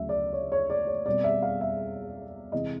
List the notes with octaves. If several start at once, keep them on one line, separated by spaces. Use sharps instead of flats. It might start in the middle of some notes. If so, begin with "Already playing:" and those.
Already playing: D2 C#3 F#3 E5
D5
C#5
C#5
D5
C#5
B2 G3 C4 D5
E5
F5
E5
C3 E3 G#3 D#5